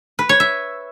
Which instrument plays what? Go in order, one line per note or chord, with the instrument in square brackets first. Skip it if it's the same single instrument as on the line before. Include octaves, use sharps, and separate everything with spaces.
[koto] B4
C#5
E5